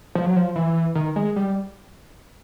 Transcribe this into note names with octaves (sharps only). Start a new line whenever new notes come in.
F3
F#3
F3
E3
D#3
G#3
G3